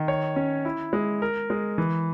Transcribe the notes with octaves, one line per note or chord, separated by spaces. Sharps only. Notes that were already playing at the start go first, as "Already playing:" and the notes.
Already playing: D#3
C#5
C#4
E4
G#3
A#4
G#3
E3